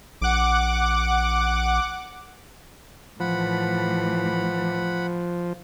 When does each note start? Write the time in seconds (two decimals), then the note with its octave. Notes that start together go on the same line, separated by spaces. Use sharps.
0.21 A#1 F#5 D6
3.20 A2 E3 F3 F#5 B5